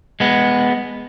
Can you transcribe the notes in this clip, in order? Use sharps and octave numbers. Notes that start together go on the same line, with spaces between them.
G#3 B3